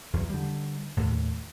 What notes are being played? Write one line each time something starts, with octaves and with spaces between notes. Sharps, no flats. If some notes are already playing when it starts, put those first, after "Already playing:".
E2 F#3
D3 G3
D#2 A2